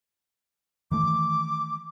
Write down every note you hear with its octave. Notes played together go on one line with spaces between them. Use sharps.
D#3 E3 A3 D6